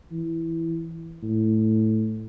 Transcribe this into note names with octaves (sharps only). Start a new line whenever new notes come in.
E3
A2